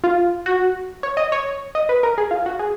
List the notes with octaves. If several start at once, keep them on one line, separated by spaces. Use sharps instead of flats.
F4
F#4
C#5
D#5
C#5
D#5
B4
A#4
G#4
F4
F#4
G#4